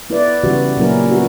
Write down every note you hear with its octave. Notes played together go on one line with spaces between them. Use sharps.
B3 E4 B4 D5
C#3 E3 G3 B3 F#4
A#2 F#3 C#4 E4 A#4
B3 F#4